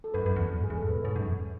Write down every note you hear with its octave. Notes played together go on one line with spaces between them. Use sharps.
A4
F#2 B4
F#2
E2
F#2
G#2 G#4
E2
G#2 A4
B2 B4
G#2 C#5
F#2
E2